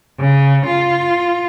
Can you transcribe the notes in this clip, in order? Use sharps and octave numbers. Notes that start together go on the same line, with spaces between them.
C#3
F4